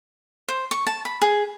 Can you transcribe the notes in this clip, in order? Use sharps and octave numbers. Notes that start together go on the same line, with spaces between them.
C5
C#6
A5
B5
G#4